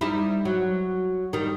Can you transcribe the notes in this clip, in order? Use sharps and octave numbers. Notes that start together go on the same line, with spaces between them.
G3 D#4 E4
F#3
D#3 G3